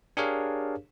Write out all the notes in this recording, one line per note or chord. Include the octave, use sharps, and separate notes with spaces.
D4 G4 G#4 A#4 C#5 F5